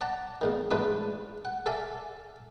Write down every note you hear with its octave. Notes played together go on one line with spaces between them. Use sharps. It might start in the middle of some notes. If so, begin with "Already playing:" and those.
D5 F#5 A5 A#5
E2 A2 D#3
A1 G#2 D4 F4 B4 D#6
F#5
A4 D5 E5 F5 G#5